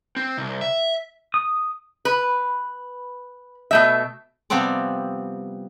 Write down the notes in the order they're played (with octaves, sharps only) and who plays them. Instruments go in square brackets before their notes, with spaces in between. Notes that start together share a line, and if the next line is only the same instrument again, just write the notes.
[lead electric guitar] C4
C2
E5
[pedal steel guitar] D#6
[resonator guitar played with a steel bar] B4
B2 A3 E5
[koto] C3 F3 G3 B3 C4 D5